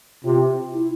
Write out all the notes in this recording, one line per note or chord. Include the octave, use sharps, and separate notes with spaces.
C3 F4
E4